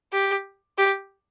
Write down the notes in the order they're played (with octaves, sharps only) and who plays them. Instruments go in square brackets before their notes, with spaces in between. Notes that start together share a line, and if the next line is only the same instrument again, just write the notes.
[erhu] G4
G4